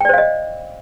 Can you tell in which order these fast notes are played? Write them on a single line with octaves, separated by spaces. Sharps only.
G5 D5 C5 F5 D#5